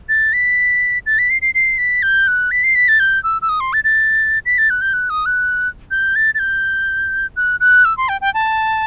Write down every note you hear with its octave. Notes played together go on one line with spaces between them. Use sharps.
A6
B6
A6
B6
C7
C7
C7
B6
G6
F#6
B6
C7
B6
A6
G6
E6
E6
D#6
C6
A6
A6
B6
A6
F#6
G6
F#6
D#6
F#6
G6
A6
A6
G6
F#6
F#6
E6
C6
G5
G5
A5